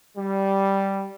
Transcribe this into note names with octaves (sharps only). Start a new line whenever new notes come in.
G3